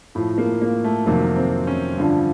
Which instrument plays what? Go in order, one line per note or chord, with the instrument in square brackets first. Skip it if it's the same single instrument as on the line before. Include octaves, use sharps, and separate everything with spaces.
[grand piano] A2 F3
A#3
A#3
A3
F2 C3 D#3 F#3 A#3
C4
C#4
G2 D3 F3